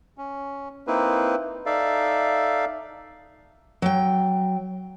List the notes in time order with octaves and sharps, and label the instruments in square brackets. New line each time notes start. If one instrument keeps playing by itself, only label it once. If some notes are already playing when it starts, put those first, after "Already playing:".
[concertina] C#4
A#3 C4 D#4 E4 B4
D#4 A4 D5 E5 F5
[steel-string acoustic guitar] F#3 G5